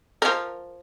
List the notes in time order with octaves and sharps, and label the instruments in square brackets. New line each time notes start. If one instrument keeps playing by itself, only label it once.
[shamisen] F3 A#4